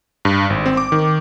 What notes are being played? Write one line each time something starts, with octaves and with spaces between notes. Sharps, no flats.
G2
G#1
C4
D6
D#3